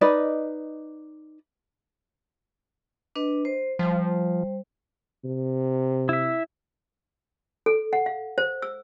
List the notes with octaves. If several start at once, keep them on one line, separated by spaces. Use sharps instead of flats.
D#4 B4 D5 D#5
D4 B4 D#5
C5
F3 G3 C5
C3
E4 E5
A4
F#5
F5
C5
E6